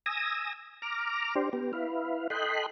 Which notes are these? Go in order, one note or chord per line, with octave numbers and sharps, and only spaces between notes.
G#5 D#6 E6 A#6
A#5 D6 F6
D4 G4 C5
B3 G4
E4 B4 F5
A4 D#5 G5 B5 C6 F#6